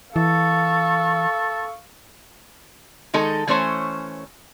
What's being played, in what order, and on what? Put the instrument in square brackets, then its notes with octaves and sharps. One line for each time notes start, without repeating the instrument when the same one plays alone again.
[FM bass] E3 [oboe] A4 [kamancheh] F5 C#6
[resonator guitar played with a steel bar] D#3 G#3 D#4 A4
E3 A3 C#4 C5 C#5